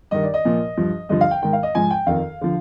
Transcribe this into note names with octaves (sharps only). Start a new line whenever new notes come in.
G2 D#3 D#5
D5
D#5
A#2 F3
G2 F3
G2 D3 F3 D#5
F5
G5
G#2 D#3 G5
F5
D#5
G#2 F3 G#5
G5
F2 D#3 F5
D3 F3